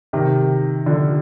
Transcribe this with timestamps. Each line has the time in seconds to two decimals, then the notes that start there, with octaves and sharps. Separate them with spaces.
0.13 C3 D#3
0.86 D3 F3